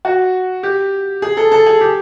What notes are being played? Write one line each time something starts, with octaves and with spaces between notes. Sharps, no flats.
F#4
G4
G#4
A4
A4
G#4
G4